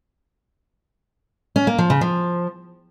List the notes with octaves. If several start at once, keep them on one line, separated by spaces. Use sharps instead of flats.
C#4
A#3
F3
C#3
F3